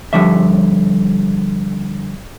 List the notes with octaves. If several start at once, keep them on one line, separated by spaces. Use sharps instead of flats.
G2 D3 F3 G3 E5